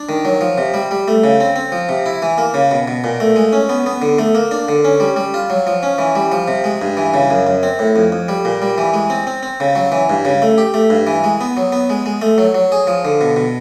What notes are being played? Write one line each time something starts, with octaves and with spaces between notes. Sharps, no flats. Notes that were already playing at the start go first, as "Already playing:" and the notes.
Already playing: D4
D#3
F#3
F3
C3
G3
G3
A3
C#3
C4
C4
F3
C3
E4
E3
A#3
C#3
B2
B2
A#2
A3
G#3
C#4
B3
B3
D3
A3
A#3
D4
D3
C#4
G3
G3
F4
F#3
F3
C#4
E3
G3
F3
C3
G#3
G2
E3
C#3
F#2
F#2
C4
A2
F2
F2
G3
A#2
G3
E3
G#3
C4
C4
C4
C#3
F#3
E3
G2
C#3
A3
G4
A3
G2
E3
G#3
B3
F#3
B3
G#3
G#3
A3
F#3
F#3
G#4
F3
D3
B2
B2